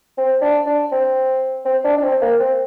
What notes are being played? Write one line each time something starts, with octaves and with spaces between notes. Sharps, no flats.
C4
D4
D4
C4
C4
D4
D4
C4
A#3
C4